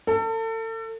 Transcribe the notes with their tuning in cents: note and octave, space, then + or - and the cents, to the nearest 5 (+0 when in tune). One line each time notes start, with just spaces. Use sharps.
A4 +35